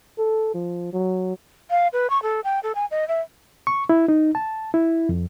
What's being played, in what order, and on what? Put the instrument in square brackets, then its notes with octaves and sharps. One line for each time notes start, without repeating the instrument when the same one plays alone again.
[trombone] A4
F3
F#3
[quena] F5
B4
C#6
A4
G5
A4
G#5
D#5
E5
[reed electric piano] C#6
E4
D#4
A5
E4
F2